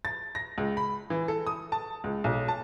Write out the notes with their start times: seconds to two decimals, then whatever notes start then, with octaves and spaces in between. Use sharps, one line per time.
0.05 A6
0.35 A#6
0.58 C#2
0.77 B5
1.10 E3
1.28 A4
1.47 D#6
1.72 A5
2.04 C#2
2.24 B1
2.48 A5